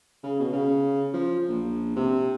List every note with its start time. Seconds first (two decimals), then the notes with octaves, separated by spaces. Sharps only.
0.24 C#3
0.40 B2
0.53 C#3
1.14 F3
1.49 A#1
1.96 C3